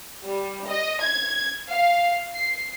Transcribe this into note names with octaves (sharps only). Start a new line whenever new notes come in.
G3
D#5
G#6
F5
C7